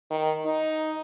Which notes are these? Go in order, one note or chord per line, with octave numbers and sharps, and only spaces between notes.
D#3
D#4